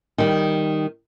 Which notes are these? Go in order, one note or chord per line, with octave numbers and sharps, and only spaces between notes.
D#3 G3